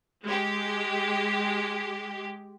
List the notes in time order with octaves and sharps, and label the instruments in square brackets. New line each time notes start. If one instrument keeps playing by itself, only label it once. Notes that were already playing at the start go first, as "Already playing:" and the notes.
[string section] G#3 G4